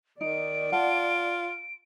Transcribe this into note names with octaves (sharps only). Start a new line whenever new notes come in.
D#3 D#4 D5 D7
F4 F#5 A5